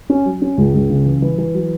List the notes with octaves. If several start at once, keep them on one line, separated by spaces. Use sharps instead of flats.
C#4
F#3
C#4
C#2
C#2
C#3
E3
E3
E3
F#3